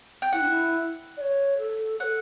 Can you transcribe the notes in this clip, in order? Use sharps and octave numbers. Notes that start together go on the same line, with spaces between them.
G5
E4 F#5
D4
E4
D5
C#5
A4
A4 C#5 F#5